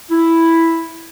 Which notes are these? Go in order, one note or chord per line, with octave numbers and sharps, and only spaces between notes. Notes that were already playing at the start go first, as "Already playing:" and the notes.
E4